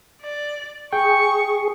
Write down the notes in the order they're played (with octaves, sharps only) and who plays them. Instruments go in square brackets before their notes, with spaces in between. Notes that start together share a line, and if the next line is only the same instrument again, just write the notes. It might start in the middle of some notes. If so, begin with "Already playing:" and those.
[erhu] D5
[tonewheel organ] G#4 [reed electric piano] G5 [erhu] C#6